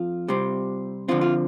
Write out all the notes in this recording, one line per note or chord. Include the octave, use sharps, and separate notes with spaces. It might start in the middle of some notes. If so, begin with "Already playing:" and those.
Already playing: F2 F4
C3 G3 C4
D3 F3 C4 F4
F4